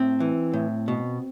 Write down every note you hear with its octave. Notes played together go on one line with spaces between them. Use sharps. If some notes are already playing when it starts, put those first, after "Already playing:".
Already playing: A2 C4
E3
A2
B2